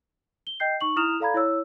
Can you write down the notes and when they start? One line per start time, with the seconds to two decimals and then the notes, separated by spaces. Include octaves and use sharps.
0.47 G7
0.60 D#5 G5 G6 C7
0.81 D#4 C#6 F#7
0.96 E4 A#5 D#6 F6 E7 F7
1.20 A4 D5 F5 A#5 B5 G#6
1.34 E4 C#5 E6